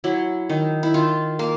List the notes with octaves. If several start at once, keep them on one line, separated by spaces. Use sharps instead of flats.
F#3 E4
D#3
E4
D#3 F4
A#3